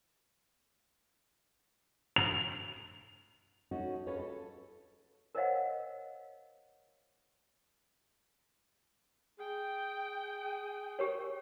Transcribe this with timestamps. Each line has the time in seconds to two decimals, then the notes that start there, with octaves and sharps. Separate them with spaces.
2.16 F7
3.71 C#4 D#4 F#4 A4
4.07 C#4 F4 G#4 A4 B4 C#5
4.19 A4
5.35 A#4 C5 C#5 D#5 F5 F#5
9.39 G#4 G5
10.99 G4 A#4 C#5